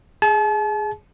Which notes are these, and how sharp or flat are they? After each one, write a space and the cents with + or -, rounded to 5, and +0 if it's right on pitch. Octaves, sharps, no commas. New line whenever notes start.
G#4 +0 A5 -40